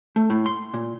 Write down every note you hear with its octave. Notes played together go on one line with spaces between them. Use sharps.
A3
A2
C6
A#2